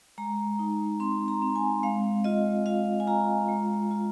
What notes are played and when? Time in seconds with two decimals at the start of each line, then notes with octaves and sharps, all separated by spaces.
0.18 G#3 A#5
0.59 D#4
1.00 C4 C6
1.28 A#5
1.42 C4
1.56 G#5
1.83 G#3 F5
2.24 F4 D#5
2.66 F4 F5
3.00 G#5
3.07 F4 A#5
3.49 G#3
3.91 F4